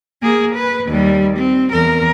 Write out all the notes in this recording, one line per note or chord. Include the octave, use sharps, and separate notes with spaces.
A#3 G#4
B4
D#2 G3
C4
E2 A#4